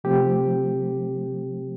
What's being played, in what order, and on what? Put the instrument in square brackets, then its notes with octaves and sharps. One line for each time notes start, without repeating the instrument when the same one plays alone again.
[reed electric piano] C3 F3 A3 C4 G4